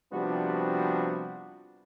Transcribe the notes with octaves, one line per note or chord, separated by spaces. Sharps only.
C3 F3 G3 B3 D4 F#4